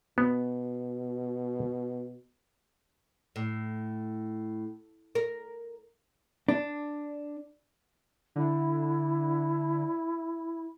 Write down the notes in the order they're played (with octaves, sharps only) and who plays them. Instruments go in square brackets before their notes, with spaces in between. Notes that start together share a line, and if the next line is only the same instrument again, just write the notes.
[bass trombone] B2 [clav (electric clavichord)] B3
[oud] A2
A#4
[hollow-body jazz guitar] D4
[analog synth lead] D3 [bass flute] E4